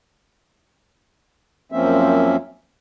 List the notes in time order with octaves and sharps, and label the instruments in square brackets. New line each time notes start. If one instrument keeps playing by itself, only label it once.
[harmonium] F#2 F3 A#3 C4 C#4 E5